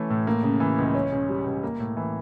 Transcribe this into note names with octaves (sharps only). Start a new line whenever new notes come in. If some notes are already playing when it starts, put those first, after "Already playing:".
Already playing: E3 A3 C#4
A2
A#3
C#3
E3
C#2
C#4
C#3
G3
C#2
A#3
A2
E3